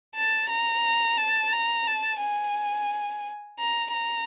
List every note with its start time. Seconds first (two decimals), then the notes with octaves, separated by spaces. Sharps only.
0.15 A5
0.49 A#5
1.17 A5
1.52 A#5
1.87 A5
2.20 G#5
3.58 A#5
3.93 A#5